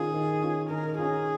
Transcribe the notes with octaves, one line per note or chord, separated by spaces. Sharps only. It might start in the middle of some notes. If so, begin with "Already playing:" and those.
Already playing: D#3 C#4 F4 G#4
D#3
C#4 F4
D#3 A#4
C#4 F4 G#4